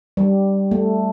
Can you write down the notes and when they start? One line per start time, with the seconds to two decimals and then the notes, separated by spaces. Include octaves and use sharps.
0.17 G3
0.71 A3